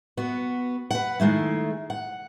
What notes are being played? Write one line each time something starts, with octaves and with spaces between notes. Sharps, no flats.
B3 F#4
B4 F#5
D#3 G#3 A3 E4
F#5